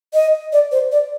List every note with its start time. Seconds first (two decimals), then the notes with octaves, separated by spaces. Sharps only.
0.14 D#5
0.53 D5
0.72 C5
0.92 D5